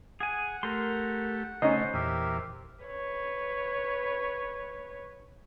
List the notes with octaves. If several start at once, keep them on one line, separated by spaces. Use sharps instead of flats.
G#4 F#5 G#5
A3 G4 A#4 C6
C#3 A3 C#4 D#4 C5 D#5
E2 A#2 G4 A#4 E5
B4 C#5